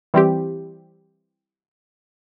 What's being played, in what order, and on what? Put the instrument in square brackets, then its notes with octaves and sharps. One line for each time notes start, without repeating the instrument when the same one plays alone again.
[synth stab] E3 G3 C4 G4